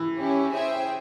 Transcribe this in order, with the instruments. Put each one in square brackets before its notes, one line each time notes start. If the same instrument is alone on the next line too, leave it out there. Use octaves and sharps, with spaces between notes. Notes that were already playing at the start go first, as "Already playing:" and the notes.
Already playing: [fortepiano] E3
[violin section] C#4 E4 G4
G#4 C5 E5 G5